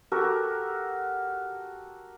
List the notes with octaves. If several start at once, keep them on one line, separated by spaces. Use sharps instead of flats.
F#4 G4 A4 A#4